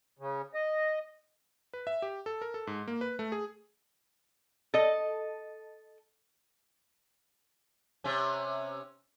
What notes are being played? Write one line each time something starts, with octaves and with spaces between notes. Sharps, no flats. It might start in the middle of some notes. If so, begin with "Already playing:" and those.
C#3
D#5
B4
E5
G4
A4
A#4
A4
G#2
A#3
B4
A3
G#4
A4 D#5
C3 C#4